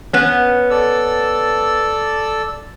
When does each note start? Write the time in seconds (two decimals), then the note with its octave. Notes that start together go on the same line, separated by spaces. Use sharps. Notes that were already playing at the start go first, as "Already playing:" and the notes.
0.13 B3 C#4
0.71 A4 D5 E6